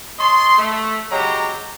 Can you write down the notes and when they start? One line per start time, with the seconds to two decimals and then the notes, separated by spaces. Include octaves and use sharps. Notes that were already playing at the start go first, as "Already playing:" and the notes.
0.19 C#5 D#5 A5 C6
0.58 A3
1.12 C#3 F#3 G#3 G4 A#5